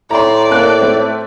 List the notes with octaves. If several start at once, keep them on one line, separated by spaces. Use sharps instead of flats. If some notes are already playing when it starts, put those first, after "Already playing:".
A2 D5 A#5 C6
A#3 A4 F#6
A3 C4